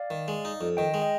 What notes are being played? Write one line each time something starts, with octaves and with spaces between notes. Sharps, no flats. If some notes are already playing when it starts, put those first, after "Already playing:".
Already playing: D5 F5
D#3
G#3
D#4
F2
D#3 D#5 G5
G#3
D#5 G5